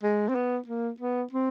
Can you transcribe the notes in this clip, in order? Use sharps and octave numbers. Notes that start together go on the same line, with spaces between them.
G#3
C4
B3
A#3
B3
C4